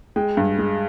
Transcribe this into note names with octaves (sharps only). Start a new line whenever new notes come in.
G#3 G5
G2
G#3